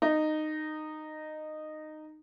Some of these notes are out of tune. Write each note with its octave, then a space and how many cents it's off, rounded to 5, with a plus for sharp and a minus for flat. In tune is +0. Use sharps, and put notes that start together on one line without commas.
D#4 -15